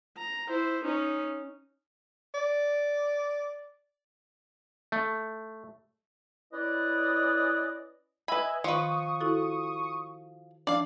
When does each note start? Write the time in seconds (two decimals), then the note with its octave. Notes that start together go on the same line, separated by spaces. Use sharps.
0.18 A#5
0.48 E4 C5
0.84 C#4 D#4
2.34 D5
4.92 A3
6.52 C#4 E4 B4 D5 D#5
8.28 B4 D#5 E5 G#5 B5
8.64 D#3 F3 B4 C#6 D#6
9.20 E4 F#4 A4
10.67 F3 D4 D5 F5